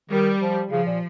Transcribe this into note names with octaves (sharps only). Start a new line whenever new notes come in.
D#3 G3
F3
C#3 F3
A#2